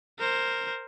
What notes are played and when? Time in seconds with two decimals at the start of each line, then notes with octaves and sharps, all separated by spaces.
0.19 A#4 C5